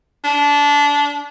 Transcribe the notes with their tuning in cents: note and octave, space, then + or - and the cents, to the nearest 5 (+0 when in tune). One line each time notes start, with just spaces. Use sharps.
D4 -20